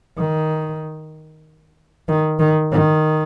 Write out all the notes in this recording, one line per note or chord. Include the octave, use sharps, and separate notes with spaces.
D#3
D#3
D#3
D#3